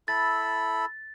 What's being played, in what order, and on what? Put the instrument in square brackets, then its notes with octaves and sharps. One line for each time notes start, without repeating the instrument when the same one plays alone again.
[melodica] E4 A4 B5 [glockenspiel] A6